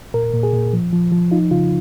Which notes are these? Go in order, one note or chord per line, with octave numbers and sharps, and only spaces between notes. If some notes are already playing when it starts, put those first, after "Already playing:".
A#2 A#4
A#2
G#4
A#2
F3
F3
F3
D#4 F4
C#3 F4